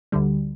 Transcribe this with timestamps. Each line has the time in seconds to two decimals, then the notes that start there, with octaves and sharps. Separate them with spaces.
0.12 D2 D3 G3